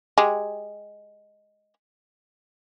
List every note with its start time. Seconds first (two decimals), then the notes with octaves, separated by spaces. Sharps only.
0.18 G#3 G4